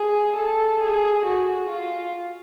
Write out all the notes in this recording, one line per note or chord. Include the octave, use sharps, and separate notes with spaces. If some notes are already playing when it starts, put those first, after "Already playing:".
Already playing: G#4
A4
G#4
F#4
F4